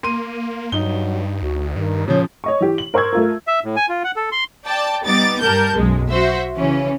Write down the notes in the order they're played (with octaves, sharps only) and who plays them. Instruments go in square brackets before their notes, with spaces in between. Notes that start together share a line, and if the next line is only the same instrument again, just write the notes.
[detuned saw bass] A#3 [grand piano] C6 D#7
[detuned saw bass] G2 [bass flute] F#3 [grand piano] D#4 G7
[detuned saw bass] D2 [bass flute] F#4
[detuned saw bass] G2 [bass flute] D#3
[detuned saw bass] A#2 [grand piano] C#3 F3 [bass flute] C#5
[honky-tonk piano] C#5 D#5 C#6
E3 G4
F#7
A#4 C5 C#6 E6 G#6
A3 F4 A#4
[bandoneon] E5
A2
G#5
F4
F#5
A4
C6
[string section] D5 G5 A5
G3 B3 D#4 D6 A6
G2 G3 A#4 A5 G6
B1 F#2 G#3
F#4 C5 E5
C#3 E3 C#4